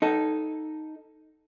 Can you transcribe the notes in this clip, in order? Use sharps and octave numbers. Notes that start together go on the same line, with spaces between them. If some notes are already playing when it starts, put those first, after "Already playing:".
D#4 A4